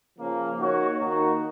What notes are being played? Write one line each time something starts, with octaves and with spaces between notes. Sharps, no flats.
C#3 F3 A#3
A#3 D#4 F#4 C#5
D#3 A#3 D#4 F#4